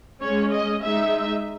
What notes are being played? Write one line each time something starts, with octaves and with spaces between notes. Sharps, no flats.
G#3 C#4 C#5
D#5
G#3 D#4 E5